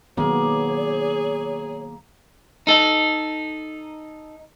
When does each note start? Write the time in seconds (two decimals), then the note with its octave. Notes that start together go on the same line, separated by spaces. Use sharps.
0.17 D#3 F#3 A#3 B3 G#4 C#5
2.67 D#4 A4